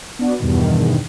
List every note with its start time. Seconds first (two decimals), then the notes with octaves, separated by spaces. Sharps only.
0.19 B3 D4 F#4
0.40 E2 G2 B2 D#3